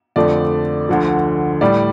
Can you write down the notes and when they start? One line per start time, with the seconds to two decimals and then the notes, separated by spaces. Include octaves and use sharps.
0.16 F2 D3 F3 A3 D5
0.89 D2 D3 F3
1.61 A2 G3 D5